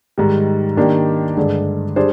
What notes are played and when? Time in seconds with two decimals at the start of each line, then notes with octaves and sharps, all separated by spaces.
0.18 G#2 D#3 G3
0.77 D#3 A#3 D4 G4
1.37 G2 D3 G#3 D4 G#4
1.96 G3 D4 G#4 C5